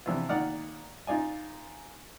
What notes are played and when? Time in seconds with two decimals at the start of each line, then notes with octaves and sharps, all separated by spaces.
0.06 C3 E3 F3 D4 E4 F4
0.29 A#2 D#3 D5 F#5 F6
1.07 D#4 F4 D5 G#5